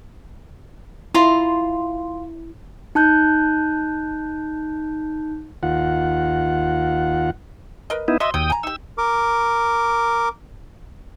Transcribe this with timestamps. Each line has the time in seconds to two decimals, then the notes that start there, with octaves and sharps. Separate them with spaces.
1.14 E4 F4 A#5 C6
2.95 D#4 A5 F#6 G6
5.63 D#2 F4 F#5
7.90 A#4 B4 D#5
8.08 B3 D#4 E4
8.20 F#3 D#5 E5 C6
8.34 D#2 F#3 G5 D#6
8.50 G#5 A#5
8.63 D#4 G4 E6
8.98 A#4 D6